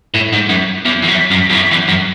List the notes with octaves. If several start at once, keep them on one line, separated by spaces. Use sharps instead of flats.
A2
G#2
F#2
E2
E2
F#2
F#2
E2
F#2
E2
F#2